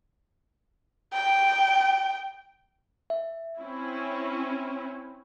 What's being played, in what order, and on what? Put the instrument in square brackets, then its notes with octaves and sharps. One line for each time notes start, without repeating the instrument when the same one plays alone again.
[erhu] G5
[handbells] E5
[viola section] C4 C#4 E4